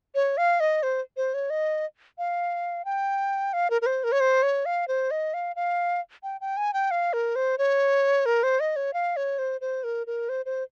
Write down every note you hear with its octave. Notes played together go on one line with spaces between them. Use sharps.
C#5
F5
D#5
C5
C5
C#5
D#5
F5
G5
F5
A#4
A#4
C5
A#4
C#5
C5
C#5
F5
C5
D#5
F5
F5
G5
G5
G#5
G5
F5
A#4
C5
C#5
A#4
C5
D#5
C#5
F5
C#5
C5
C5
A#4
A#4
C5
C5